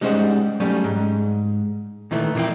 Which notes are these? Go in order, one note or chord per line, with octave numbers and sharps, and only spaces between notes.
G3 G#3 C#4 D#4 C5 F#5
F#3 G3 A3 C#4
G#2
A#2 D#3 E3 A3
F2 A#2 A#3 E4 G5